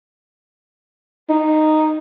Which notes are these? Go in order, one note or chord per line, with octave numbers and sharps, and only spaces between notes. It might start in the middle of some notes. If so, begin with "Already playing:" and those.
D#4